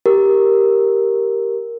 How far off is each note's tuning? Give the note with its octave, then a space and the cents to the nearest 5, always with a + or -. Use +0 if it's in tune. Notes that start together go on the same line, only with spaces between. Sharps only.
G4 +0 A#4 +0